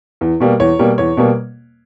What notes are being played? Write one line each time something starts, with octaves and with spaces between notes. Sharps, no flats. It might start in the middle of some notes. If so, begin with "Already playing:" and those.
E2
B2 G3 A#3
E2 C#5
B2 G3 A#3
E2 C#5
B2 G3 A#3